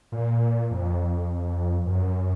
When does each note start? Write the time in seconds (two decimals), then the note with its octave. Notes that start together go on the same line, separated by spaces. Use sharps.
0.12 A#2
0.71 F2
1.86 F#2